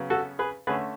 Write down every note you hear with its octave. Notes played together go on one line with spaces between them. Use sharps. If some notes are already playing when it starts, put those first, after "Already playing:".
Already playing: C#3 F#3 B3
F#4 A4
G#4 B4
D3 A3 C#4 G#4 B4